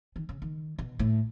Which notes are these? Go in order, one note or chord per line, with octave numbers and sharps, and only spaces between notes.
D#3
C#3
D#3
B2
A2